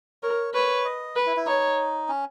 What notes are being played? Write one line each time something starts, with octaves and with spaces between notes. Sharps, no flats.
A#4 C#5
B4 C#5
D#5
B4
E4
E4
D#4 C#5
C#4